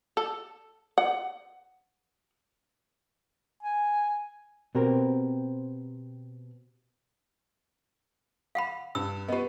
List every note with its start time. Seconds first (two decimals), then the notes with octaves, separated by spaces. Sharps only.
0.17 A4
0.98 F#5
3.63 G#5
4.75 B2 C4 G4 A#4
8.55 F5 F#5 B5
8.95 G2 E6
9.28 B3 G4 B4 D#5